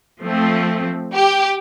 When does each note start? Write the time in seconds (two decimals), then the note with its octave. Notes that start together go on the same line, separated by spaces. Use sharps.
0.21 F3 A3 C4
1.13 G4